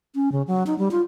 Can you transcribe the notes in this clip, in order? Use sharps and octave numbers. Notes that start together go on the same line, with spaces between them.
C#4
C#3
F#3
D#4
G3
F4